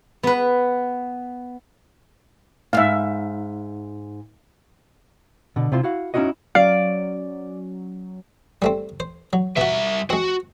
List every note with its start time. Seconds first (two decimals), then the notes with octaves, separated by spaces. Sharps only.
0.23 B3 B4
2.73 D#2 G#2 E5 F5
5.56 B2 D3
5.72 C3 C4 E4 F4 C6
5.83 E4 F#4 F5
6.14 C#4 D#4 E4 F#4 D#5
6.55 F#3 C#4 D5 F5
8.62 G3 A3 C4
9.00 C5
9.33 F#3
9.57 B2 G3 F#4 E5
10.10 G#3 C4 F#4